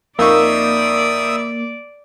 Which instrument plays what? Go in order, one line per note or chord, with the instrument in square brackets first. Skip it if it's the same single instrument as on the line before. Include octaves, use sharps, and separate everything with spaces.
[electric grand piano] F2 D#4 C#6 [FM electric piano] A#3 [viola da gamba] D5 [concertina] E5 D#6 E6